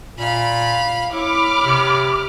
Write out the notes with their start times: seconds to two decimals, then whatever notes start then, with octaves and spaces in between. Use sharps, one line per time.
0.19 A#2 F5 B5
1.12 E4 C#5 B5 D6 F6
1.64 C3